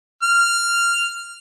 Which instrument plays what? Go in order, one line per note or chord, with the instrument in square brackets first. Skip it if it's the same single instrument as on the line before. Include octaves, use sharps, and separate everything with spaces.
[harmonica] F6